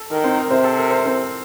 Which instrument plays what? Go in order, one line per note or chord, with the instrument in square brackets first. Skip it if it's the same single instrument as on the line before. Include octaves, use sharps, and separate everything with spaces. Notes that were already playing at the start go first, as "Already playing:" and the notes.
Already playing: [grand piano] A4
[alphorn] D#3 [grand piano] A#4
[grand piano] C4 C5
A#4
[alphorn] C3 [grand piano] C4 C5
[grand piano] A4
A#4
C5
A#4
C4 C5